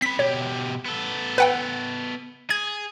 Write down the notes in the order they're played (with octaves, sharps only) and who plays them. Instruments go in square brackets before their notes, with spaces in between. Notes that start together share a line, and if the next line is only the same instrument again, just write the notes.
[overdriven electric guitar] C4 B5 [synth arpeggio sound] B6
[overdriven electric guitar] B2 G4 [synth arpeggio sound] C#5
[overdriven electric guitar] B3 A4
[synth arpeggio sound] B4 F#5 G5
[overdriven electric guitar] G#4 [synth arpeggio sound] G#6